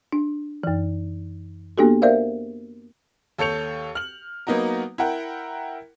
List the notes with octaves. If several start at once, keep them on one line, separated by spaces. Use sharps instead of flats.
D4
F#2 E3
A#3 B3 D4 F#4 G4 A4
A#4 C5 D5 E5 F5
D#2 A4 C#5 G6 C#7 F7
F6 F#7
F#3 A#3 B3 D#4 F#4 A#4
E4 A#4 F#5 G5